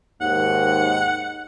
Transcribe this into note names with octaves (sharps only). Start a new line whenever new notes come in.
D#2 G#2 D#3 F#5